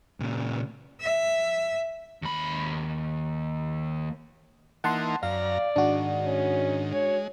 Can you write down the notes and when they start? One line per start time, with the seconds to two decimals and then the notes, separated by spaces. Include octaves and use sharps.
0.20 A#2 C#3
1.01 E5
2.22 D#2 B5
4.84 E3 A#3 D#4 F#5 A5 C6
5.23 F#2 D5 F5 A#5
5.76 G#2 D#3 D4 F#4
6.25 C#4
6.93 G#3 C#5